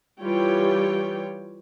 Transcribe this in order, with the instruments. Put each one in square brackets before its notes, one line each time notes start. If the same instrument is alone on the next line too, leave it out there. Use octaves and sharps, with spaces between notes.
[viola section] E3 G3 F4 G4 C#5 G5